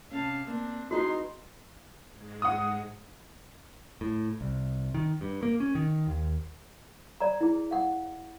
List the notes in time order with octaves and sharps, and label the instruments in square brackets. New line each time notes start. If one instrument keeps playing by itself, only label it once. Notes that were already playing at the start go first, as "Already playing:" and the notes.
[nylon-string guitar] C3 C#4 [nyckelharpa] F5 A5
[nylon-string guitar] A#3 [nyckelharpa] C4 D4
[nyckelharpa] G#3 C6 [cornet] D#4 [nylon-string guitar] E4 B4 D#5 [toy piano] F#4
[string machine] G#2 G#3
[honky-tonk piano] F#5 D#6
[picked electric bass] A2
C2
D#3
G2
A#3
C#4
D#3
D#2
[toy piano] D5 A#5
E4 G#4
F5 F#5